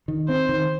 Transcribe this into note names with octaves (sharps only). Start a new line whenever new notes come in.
D#3
C4 C5
D#3